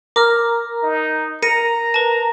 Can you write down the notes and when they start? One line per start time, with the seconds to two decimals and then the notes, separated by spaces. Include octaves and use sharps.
0.16 A#4 A#5 D6 F6
0.83 D#4
1.42 A#4 A#5 A#6 C#7 D#7
1.94 B4 A5